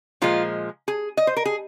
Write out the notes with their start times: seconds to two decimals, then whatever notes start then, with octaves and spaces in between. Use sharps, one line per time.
0.22 A#2 F3 G#3 F4
0.88 G#4
1.17 D#5
1.27 C5
1.37 A#4
1.45 G#4